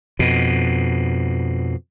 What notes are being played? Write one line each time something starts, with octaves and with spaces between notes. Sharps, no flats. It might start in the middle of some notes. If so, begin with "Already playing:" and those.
F2 B2